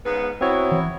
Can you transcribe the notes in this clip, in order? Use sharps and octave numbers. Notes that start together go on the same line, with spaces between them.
G#2 C#3 B3
F#3 B3 C4 E4 F#4 C#5
E3